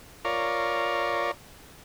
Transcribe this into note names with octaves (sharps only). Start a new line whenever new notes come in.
F4 A#4 C#5 D5